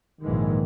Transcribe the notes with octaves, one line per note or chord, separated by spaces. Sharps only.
A#1 G#2 D#3 E3 G#3